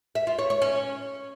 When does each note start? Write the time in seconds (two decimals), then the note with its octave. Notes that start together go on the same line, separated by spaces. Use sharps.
0.15 E5
0.27 F4
0.38 C#5
0.50 C#5
0.62 C#4